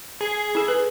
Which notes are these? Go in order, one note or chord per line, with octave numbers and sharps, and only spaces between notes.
G#4
E4 A4
B4